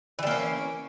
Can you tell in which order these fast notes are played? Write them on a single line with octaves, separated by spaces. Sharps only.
E3 G3 A#3 C#4